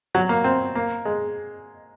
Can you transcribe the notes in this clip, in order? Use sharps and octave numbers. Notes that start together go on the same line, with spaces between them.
F#3
A#3
C4
A#3
G#3